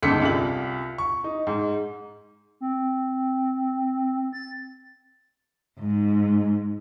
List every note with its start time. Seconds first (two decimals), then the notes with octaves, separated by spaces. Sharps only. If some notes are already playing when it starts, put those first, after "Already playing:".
0.02 G1 C#2 G#2 A4 B6 C#7
0.22 C2 F4 F#7
0.98 C#6
1.24 D#4
1.47 G#2
2.61 C4
4.33 A6
5.79 G#2